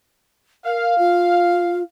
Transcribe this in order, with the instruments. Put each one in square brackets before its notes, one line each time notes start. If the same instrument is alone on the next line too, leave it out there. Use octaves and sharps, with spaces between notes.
[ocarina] A#4 [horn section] F5
[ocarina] F4